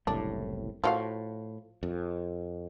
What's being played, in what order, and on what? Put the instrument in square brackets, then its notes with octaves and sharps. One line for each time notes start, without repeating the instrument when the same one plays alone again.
[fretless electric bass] F#1 C2 A2 [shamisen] D4
[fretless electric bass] A2 [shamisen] F3 F#4 F5
[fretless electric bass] F2